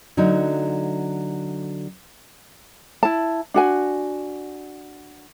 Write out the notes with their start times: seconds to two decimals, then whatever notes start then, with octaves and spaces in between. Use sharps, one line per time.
0.17 D3 F#3 A3 D#4
3.03 E4 A5
3.54 D4 F#4 G#5